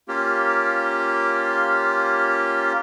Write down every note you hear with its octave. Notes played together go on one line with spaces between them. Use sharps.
A#3 C#4 F4 G4